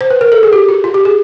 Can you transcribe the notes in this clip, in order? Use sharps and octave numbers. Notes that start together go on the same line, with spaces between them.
C5
B4
A#4
A4
G#4
G4
F#4
F4
G4
G#4